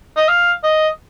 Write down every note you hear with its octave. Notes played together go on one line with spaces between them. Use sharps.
D#5
F5
D#5